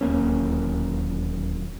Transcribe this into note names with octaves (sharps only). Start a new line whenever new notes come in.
D1 D#2 A#3 C#4